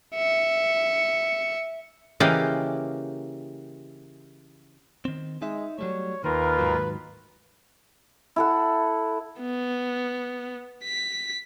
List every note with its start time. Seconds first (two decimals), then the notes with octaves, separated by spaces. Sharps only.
0.15 E5 C#7
2.20 C#3 E3 A#3 G4 D#5 F5
5.05 D#3 C4
5.42 G#3 D#4 E5
5.79 F#3 G3 A3 C#5
6.24 D#2 D#3 F4 A#4 B4
6.59 G#2 D#3 F#3
8.36 E4 A4 F#5
9.40 B3
10.84 B6